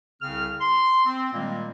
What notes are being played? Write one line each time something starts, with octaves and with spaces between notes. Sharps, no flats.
C2 C#3 C4 G#4 F6
C6
C4
A#2 D#3 G3 G#3 A#3 C4